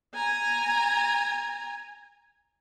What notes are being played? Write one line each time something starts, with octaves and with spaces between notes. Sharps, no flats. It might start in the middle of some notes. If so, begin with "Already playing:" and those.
G#5 A#5